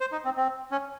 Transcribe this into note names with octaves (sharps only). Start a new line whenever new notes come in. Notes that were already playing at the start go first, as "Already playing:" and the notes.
C5
D#4
C4
C4
C#4